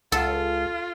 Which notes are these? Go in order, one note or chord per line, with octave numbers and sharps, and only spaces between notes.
C#2 F4 A4